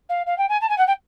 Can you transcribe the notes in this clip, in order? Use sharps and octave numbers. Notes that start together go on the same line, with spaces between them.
F5
F5
G5
G#5
A5
G#5
F#5
G5